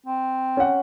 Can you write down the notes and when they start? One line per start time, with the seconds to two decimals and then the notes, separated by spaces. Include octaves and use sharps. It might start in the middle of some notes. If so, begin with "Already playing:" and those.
0.06 C4
0.57 C#4 F#5